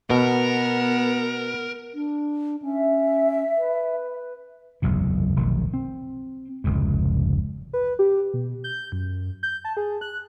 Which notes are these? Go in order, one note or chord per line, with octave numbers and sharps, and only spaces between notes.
B2 B3 A#4
D4
C#4 E5
B4
F#1 B1 E2 C3
F1 B1 D#3
C4
F1 C#2 G#2
B4
G4
B2
G6
F#2
G6
A5
G#4
F#6